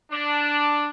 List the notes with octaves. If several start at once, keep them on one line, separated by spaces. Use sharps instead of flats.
D4